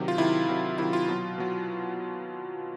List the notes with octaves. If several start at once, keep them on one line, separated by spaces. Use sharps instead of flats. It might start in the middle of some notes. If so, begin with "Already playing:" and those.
Already playing: C3 D#3 F#3
F4
C3 D#3 F#3 E4
C3 D#3 F#3
C3 D#3 F#3 E4
F4
B2 F#3
B2 F#3